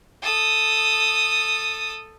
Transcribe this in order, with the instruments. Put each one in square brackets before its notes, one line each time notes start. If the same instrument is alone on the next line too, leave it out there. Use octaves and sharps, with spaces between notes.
[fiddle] A4 D#6